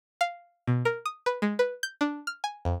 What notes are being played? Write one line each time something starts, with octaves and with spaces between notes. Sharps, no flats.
F5
B2
A#4
D#6
B4
G#3
B4
G6
D4
F6
G#5
F2